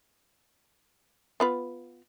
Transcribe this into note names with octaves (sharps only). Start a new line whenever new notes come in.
B3 F4 B4